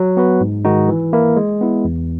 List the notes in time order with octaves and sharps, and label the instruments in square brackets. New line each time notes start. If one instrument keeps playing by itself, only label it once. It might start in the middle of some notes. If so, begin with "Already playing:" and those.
Already playing: [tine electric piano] F#3
B3 F#4 B4
G#2
D#3 G#3 D#4 F#4
E3
A#3 E4 A#4
G#3
B3 E4
E2